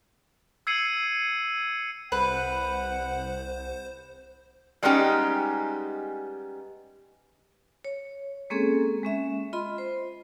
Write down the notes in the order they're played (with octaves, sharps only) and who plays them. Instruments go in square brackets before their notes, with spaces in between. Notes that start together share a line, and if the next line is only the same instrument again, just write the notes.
[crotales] E6 G#6 C7 C#7 D#7 F#7
[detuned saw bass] C2 [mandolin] B4 [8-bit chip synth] C5 [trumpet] F#5
[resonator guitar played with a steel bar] G3 G#3 B3 C#4 D#4 G4
[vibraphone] C#5
G#3 A#3 C4 C#4 G#4 A4
G#3 C#4 E5
F4 D#5 B5 C6
C5